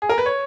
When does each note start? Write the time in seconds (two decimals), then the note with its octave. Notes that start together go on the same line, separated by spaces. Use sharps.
0.02 G#4
0.09 A#4
0.18 B4
0.26 C#5